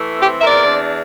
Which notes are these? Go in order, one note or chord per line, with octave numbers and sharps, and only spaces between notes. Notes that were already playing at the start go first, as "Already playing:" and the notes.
Already playing: E3 A3
C4 G4
E5
E2 A#4 D5
D4